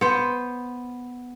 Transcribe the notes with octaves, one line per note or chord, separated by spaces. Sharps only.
B3 C5